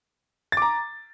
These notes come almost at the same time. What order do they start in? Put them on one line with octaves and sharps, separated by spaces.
A6 D6 A#5